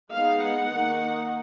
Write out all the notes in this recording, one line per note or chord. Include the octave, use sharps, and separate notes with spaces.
G#3 B3 D#4 F5
F#5
D#3 A#3 D#4